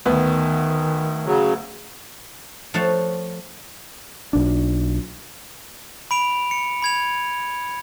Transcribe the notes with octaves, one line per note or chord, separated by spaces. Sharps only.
D2 D#3 B3
C#3 F#3
F3 A3 C#5 F5 F#5 A5
B1 D4
B5 D7 F7
C#7
B5 G#6 F7